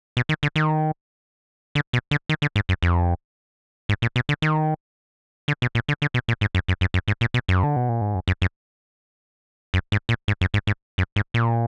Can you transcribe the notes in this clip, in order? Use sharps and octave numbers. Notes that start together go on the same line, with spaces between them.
B2
D#3
D3
D#3
D3
B2
D3
D#3
D3
G#2
F#2
F2
G#2
A#2
B2
D3
D#3
D3
B2
A#2
D3
D3
B2
A#2
G#2
F#2
F#2
F#2
F#2
G#2
A#2
B2
F#2
D3
B2
A#2
G#2
F#2
F#2
F#2
F#2
G#2
A#2
G#2
F#2
G#2
G#2
F#2
G#2
A#2